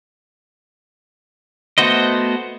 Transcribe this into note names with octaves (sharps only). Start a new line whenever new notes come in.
A3 B3 F#4 C5 D#5